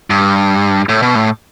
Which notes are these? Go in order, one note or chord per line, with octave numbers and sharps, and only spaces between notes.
G2
A2
B2
A2